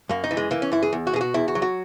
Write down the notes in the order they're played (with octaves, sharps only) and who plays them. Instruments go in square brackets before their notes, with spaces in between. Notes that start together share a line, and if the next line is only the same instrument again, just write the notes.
[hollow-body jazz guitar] F#2 A#3
D#4
E3
G#3
E3 A#3
C#4
F#2 E4
G#4
E2
F#4
B2 G#4
F#4
E2 E4
F#4
F#3
F#4